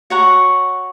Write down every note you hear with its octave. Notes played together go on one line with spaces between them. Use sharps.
F#4 C#5 F#5 A#5